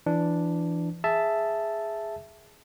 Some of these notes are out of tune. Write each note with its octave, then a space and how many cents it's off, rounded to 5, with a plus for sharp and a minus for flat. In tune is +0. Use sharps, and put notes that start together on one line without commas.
E3 +25 D4 +0
G#4 +0 E5 +5 A5 +0